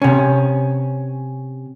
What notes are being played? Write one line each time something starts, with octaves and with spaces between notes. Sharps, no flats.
C3 C#4